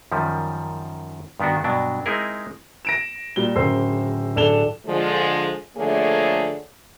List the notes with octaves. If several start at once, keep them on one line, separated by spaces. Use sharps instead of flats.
F#2 D#3 F3 G3
G2 D#3 B3 D4 F#4
G2 B2 F#3 D4
G#3 C4 D#4 E4 G#4 A#4
A#6 D7 E7
A#2 G3 G7
D1 C#3 A#4 C5 E6 C7
D1 D4 A4 E7 F7 G7
D3 F3 G#3
D3 F3 A3 A#3 G#4 C#5